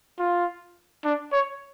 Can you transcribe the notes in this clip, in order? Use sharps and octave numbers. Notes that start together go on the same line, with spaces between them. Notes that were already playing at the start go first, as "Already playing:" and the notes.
F4
D4
C#5